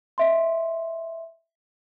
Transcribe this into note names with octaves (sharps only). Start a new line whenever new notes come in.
D#5 E5 C6